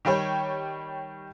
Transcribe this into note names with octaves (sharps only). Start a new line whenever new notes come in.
D#3 G3 G4 C#5